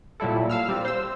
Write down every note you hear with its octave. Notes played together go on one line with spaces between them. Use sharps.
A#2 F#3 G3 E4 A4
F5 E6 F6
G3 C4
C5 E6